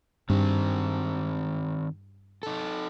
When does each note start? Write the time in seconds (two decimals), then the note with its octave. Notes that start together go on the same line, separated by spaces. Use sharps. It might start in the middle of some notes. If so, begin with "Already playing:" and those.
0.30 G2 D#3 C4
2.43 D#4 A4